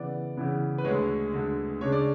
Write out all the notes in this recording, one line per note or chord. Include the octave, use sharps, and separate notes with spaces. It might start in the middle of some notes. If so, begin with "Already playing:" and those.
Already playing: C#3 E3 B3 E4 D5
C#3 E3 B3 E4
B4
D2 D3 G#3 C#5
D2 D3 G#3
C#3 G#3 D4 C#5
D5